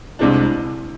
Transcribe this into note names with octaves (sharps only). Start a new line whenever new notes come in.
C2 C3 G#3 D4 E4